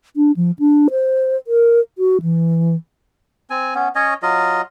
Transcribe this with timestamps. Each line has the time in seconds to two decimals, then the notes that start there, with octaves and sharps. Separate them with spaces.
0.16 D4
0.36 F3
0.59 D4
0.91 C5
1.47 A#4
1.98 F#4
2.22 E3
3.50 C4 G#5
3.75 B3 C#4
3.95 C#4 C#5 D#5
4.22 F#3 F4 D#5